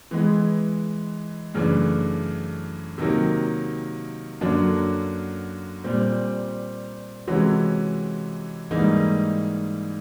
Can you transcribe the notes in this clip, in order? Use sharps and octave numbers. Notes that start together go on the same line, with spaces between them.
E3 G#3 B3
F#2 C#3 E3 A3 D4
C3 D#3 F#3 A#3
F#2 D3 F#3 A#3 D4
A#2 G3 C4
C3 E3 G#3 C#4 F#4
G#2 E3 G3 A#3 D#4